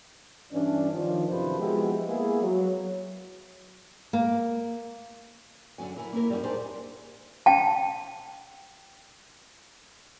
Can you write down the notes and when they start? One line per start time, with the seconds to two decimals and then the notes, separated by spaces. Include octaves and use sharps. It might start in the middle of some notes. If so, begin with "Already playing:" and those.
0.53 G2 E3 C#4 D4
0.92 D#3 F3
1.29 F#2 C3 D#3 F3 B4 C5
1.60 F3 G#3 B3 E4 F#4 G4
2.08 G#3 A#3 B3 E4 G#4
2.42 F#3
4.13 A#3
5.78 F#2 D3 F#3 G#5
5.97 E4 A#4 G#5
6.12 A#3 E4 A#4
6.30 F#2 G3
6.43 D4 D#4 G4 G#4 A#4 C5
7.46 G5 A5